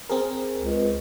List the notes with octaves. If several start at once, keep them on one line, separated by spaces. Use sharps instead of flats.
C4 G#4 A#4
C#2